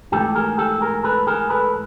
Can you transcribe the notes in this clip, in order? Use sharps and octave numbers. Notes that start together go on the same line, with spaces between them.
G#2 E3 A3 G4 A4
G#4 A#4
G4 A4
G#4 A#4
A4 B4
G#4 A#4
A4 B4